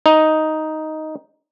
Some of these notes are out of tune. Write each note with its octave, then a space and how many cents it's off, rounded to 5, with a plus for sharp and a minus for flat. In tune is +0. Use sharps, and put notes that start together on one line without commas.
D#4 +5